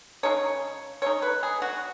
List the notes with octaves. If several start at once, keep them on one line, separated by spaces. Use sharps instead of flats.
C#3 G#3 D#4 C#5
C#3 G#3 D#4 C#5
B4
G#4
F#4